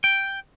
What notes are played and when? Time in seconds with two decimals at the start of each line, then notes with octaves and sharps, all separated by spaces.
0.04 G5